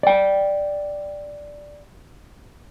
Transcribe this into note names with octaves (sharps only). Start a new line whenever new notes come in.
D5 G5